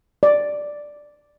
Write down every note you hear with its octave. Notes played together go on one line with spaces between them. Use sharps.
D5